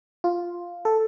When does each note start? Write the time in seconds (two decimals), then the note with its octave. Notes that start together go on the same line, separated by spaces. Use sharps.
0.24 F4
0.85 A4